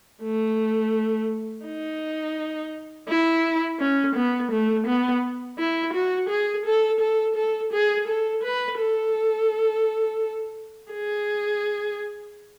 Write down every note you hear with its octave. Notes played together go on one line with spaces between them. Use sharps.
A3
D#4
E4
C#4
B3
A3
B3
E4
F#4
G#4
A4
A4
A4
G#4
A4
B4
A4
G#4